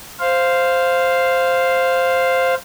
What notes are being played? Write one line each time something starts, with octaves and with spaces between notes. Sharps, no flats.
C5 F5